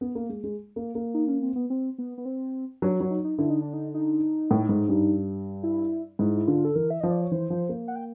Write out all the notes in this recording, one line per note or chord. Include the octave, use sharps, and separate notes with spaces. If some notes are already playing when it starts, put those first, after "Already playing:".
B3
A#3
G#3
G#3
A#3
A#3
D#4
C#4
C4
B3
C4
B3
B3
C4
F#3 D4
F#3
D#4
D#4
D3 E4
D#4
D4
D#4
D#4
A2
G#2
G2
E4
G#2 E4
E4
D3 F4
A4
E3 A#4
E5
F3 D#5
D5
C#5
E3 C5
F3
A#3
F#5
G5